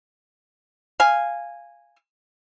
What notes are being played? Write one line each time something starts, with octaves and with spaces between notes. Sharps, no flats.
F5 G#5